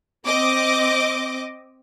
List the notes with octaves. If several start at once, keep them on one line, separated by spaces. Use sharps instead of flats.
C4 D#5 D6